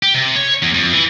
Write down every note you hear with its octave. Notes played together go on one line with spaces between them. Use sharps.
G4
C3
C#5
E2
F2
E3